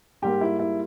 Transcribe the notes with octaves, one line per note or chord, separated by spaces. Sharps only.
G#2 G3 A#3 G4
E4
E4